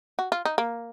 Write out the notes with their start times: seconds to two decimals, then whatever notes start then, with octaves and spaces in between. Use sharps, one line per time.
0.19 F#4
0.32 F4
0.45 D#4
0.58 A#3